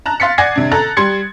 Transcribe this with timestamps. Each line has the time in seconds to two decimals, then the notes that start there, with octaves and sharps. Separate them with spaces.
0.06 A5 A#5 F#6
0.20 F5 C6 A6 B6 C#7
0.38 D5 F#5 G#5 G#6 A#6 C7
0.56 C3 D4
0.72 A4 A#5 F#6 A6
0.97 G3 C6 G#6 C#7